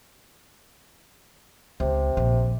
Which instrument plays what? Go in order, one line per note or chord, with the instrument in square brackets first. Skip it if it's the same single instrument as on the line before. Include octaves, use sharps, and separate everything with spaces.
[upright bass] C#2 [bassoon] C3
[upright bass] A#1